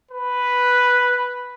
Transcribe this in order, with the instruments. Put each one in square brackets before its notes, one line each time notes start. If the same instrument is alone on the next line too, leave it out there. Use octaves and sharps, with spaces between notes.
[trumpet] B4